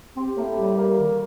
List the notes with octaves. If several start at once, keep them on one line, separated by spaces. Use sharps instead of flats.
C4 G4
A2 A#3
G3 G4
A#3
D#3